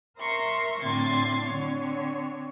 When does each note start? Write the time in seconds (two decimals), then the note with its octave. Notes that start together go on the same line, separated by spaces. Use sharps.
0.18 A#4 C5 E5 A#5 C6 C#6
0.80 A2 D3 C4 C6 G#6 A6
1.44 D3 C4 C#5